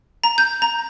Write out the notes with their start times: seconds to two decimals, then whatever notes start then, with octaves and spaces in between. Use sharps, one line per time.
0.24 A#5
0.38 G6
0.62 A#5